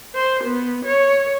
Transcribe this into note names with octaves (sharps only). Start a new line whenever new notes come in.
C5
B3
C#5